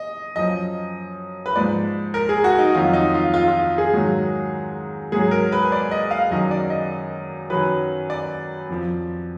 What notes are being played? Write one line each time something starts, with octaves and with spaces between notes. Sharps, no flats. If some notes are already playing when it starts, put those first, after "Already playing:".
Already playing: D#5
F#2 F3 D#5
B4
G#2 F3 D5
A#4
G#4
F#4
D#4
F2 D#3 F#3 F4
D#4
F4
F4
F4
G#4
G#2 D#3 F#3
G#2 F#3 G#4
A#4
B4
D5
D#5
F5
F#2 D#3 F#3 D#5
D5
D#5
F#2 D#3 F#3 B4
D5
F2 F3